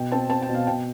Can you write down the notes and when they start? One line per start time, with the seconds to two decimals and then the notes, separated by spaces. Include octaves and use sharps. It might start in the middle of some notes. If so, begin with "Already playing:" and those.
Already playing: B2 G5
0.12 C4 A5
0.30 C4 A5
0.42 G5
0.49 B2
0.55 F5
0.67 B2 G5